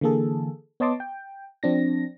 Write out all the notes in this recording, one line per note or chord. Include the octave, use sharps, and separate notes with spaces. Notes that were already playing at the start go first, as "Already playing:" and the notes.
D3 E3 A#3 G#4 A4
B3 C#5 D#5 A5 C6 D6
G5
F3 C4 D4 A#6